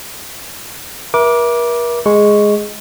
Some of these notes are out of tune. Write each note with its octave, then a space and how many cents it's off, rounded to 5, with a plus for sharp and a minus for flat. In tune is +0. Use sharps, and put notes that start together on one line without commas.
A#4 +45 E5 +0 D6 +0
G#3 +0 C#6 +0